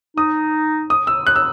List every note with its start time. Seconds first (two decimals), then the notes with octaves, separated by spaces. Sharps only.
0.16 D#4 D#6
0.90 D#6
1.07 E6
1.27 F#6
1.36 E6